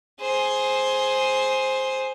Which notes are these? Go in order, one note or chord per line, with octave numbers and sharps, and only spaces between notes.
G#4 C5